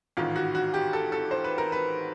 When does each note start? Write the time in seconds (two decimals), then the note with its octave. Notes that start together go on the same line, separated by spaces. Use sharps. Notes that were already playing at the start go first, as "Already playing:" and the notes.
0.17 A1 G#2 D#3 F4
0.36 F#4
0.55 F#4
0.74 G4
0.93 A4
1.12 A4
1.31 C5
1.44 B4
1.58 A#4
1.72 B4